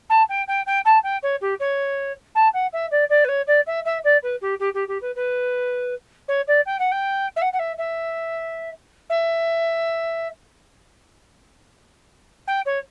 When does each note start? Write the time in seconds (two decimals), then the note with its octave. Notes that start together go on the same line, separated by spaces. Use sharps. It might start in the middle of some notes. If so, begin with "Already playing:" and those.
0.09 A5
0.29 G5
0.48 G5
0.66 G5
0.85 A5
1.03 G5
1.23 C#5
1.41 G4
1.60 C#5
2.35 A5
2.53 F#5
2.73 E5
2.91 D5
3.09 D5
3.24 B4
3.28 C#5
3.47 D5
3.67 E5
3.85 E5
4.04 D5
4.23 B4
4.41 G4
4.59 G4
4.74 G4
4.88 G4
5.01 B4
5.15 B4
6.28 C#5
6.48 D5
6.66 G5
6.79 F#5
6.92 G5
7.36 E5
7.42 F#5
7.53 F#5
7.59 E5
7.78 E5
9.10 E5
12.47 G5
12.66 C#5